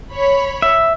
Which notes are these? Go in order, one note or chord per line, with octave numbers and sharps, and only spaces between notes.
C#5 B5
E5